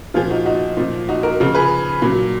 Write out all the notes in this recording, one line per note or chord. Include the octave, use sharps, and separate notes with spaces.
A#2 F3 F4 G#4
D#4 F#4
D#4 F#4
A#2 F3
D#4 F#4
F#4 A#4
C#3 F3
G#4 B4
A#2 F#3